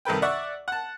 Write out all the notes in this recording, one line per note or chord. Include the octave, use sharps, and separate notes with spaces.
C2 D#3 A4 B4 G5
D5 E5 F#5 C#6
F#5 A5